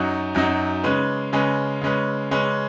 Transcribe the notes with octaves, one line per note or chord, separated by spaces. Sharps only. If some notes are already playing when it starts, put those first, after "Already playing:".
Already playing: F#2 F#3 D#4 F#4
F#2 F#3 D#4 F#4
C#3 G#3 C#4 B4
C#3 G#3 C#4 B4
C#3 G#3 C#4 B4
C#3 G#3 C#4 B4